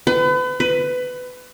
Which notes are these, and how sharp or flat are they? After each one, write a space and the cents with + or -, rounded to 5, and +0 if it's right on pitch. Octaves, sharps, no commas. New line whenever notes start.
B4 +35
B4 +20